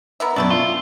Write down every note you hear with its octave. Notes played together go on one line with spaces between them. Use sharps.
B3 A#4 E5
F#2 B2 F#3 A3 D4 E4
F4